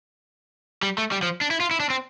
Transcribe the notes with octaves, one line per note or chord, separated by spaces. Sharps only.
G3
A3
G3
F3
D4
E4
F4
E4
D4
C4